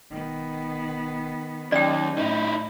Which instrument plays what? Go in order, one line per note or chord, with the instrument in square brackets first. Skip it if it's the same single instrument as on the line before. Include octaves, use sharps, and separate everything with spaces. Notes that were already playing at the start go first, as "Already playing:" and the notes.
[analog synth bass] E1 [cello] D#3 B3
[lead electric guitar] D#2 [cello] F#3 D#4 [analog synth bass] C#4 [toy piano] D5 G5
[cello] A2 [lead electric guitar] D#4 E4